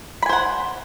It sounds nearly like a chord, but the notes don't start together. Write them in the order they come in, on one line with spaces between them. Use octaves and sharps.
B5 G#5 C5 F#5